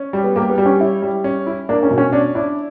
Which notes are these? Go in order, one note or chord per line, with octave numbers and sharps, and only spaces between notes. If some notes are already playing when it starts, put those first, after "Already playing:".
Already playing: C#4
G3
B3
A#3 G4
B3
G3
C#4
C#4 E4
G3
C#4
E4
A#3 D4
C#4
B2
C#4
C#4 D4
D4 E4